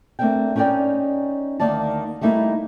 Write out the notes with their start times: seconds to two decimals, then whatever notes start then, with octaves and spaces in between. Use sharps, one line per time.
0.19 A3 A#3 C4 D4 A#4 G5
0.56 C#4 D#4 A#4 C5 D5 G5
1.60 D2 D#3 A#3 D5 A5
2.21 G3 A3 A#3 D#4 E4